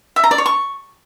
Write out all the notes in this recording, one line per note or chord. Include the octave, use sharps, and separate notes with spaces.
E5
A#5
D5
C#5
C#6